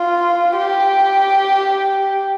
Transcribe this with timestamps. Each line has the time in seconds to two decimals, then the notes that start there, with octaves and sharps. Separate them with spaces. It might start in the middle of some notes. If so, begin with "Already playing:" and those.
Already playing: F4
0.57 G4